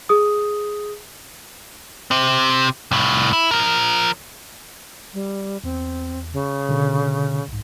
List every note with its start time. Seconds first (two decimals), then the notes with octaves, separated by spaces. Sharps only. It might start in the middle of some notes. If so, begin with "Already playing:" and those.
0.09 G#4 D#6
2.11 C3 C4
2.91 C2 A2
3.33 E4
3.51 F3 A#4
5.14 G3
5.64 E2 C4
6.33 C#3
6.69 B2 D3
7.48 B1 G#2